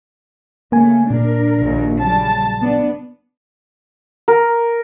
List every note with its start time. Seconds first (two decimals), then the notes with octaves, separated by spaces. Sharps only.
0.72 C#3 A3 A#3 G#5
1.10 A#2 D4 A#4
1.59 A#1 D#2
1.99 C#3 F#3 G3 A5
2.61 B3 D4
4.28 A#4